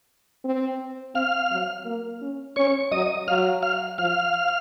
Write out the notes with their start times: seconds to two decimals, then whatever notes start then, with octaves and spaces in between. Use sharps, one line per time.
0.44 C4
1.15 C4 F5 F6
1.51 F#3
1.85 A#3
2.21 C#4
2.56 C#4 C#5 C#6
2.92 F#3 D#5 D#6
3.27 F#3 F5 F6
3.63 F5 F6
3.98 F3 F5 F6